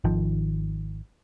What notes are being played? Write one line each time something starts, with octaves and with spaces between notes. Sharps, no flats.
G#1 D#3 F3